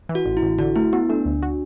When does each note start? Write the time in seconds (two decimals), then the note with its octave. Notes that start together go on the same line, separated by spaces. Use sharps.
0.09 E3
0.15 F#4
0.26 A1
0.37 E4
0.43 A1
0.59 D3 F#4
0.76 A3 E4
0.93 B3 F#4
1.09 A3 D4
1.25 D2
1.43 F#4